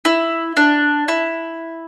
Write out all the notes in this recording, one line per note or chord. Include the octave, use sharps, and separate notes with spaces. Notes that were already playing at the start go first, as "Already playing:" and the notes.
E4
D4
E4